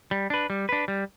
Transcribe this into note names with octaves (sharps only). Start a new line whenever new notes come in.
G3
D4 B4
G3
D4 B4
G3